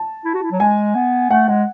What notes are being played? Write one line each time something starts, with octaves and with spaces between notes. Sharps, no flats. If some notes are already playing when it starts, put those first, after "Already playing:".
Already playing: A5
E4
F#4
E4
F#3
G#3 G#5
B3
A3 F#5
G#3 F#5